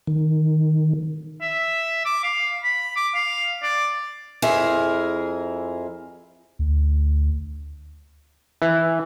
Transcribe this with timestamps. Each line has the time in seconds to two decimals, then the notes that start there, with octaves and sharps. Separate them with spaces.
0.07 D#3
1.41 E5
2.05 D6
2.23 F5
2.63 B5
2.96 D6
3.15 F5
3.62 D5
4.42 F2 E4 G#4 A#4
6.59 D2
8.62 E3